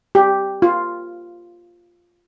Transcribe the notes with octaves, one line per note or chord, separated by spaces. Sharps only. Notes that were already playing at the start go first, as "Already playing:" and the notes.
G4
F4